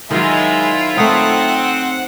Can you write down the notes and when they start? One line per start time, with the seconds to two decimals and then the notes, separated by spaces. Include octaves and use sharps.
0.11 D#3 F#3 G#3 E4 F4 E5
0.97 A3 C4 D#4 F#5